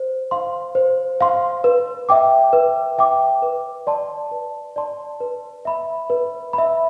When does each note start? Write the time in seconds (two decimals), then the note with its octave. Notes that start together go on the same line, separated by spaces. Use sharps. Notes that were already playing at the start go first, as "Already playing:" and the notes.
Already playing: C5
0.31 F5 C6
0.75 C5
1.21 F5 C6
1.64 B4
2.09 E5 G5 D6
2.53 B4
2.98 E5 G5 D6
3.42 B4
3.87 D5 A5 C6
4.31 B4
4.76 D5 A5 C6
5.21 B4
5.65 E5 B5
6.10 B4
6.53 B5
6.58 E5